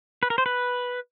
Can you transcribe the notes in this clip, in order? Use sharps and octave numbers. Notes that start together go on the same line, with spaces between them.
B4
A#4
C5
B4